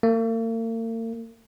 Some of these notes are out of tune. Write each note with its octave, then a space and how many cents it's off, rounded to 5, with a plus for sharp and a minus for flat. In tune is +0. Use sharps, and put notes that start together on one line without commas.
A#3 -45